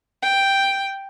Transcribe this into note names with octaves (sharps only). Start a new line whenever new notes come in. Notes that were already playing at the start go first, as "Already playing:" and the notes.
G5